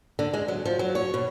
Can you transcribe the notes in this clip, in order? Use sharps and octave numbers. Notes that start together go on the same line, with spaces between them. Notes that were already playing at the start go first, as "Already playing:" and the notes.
D3
G#3
F#3
F3
F#3
C#5
B2